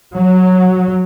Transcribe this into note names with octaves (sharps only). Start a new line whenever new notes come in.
F#3